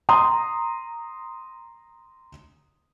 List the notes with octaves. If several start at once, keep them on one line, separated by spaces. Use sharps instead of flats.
A#5 C6 D#6